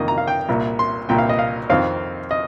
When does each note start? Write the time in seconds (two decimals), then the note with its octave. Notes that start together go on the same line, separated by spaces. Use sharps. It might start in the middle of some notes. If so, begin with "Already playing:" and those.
Already playing: F2 D#3 A#3 D#5
0.08 A#5
0.18 F5
0.27 G5
0.49 C2 A#2 A#3
0.79 C6
1.09 C2 A#2 A#3 G5
1.18 F5
1.29 D#5
1.39 F5
1.70 F2 D#3 C4 F5
2.31 D#5